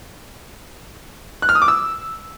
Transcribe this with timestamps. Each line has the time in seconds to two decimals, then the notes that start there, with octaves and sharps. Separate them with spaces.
1.42 F#6
1.49 F6
1.55 D#6
1.62 D6
1.68 E6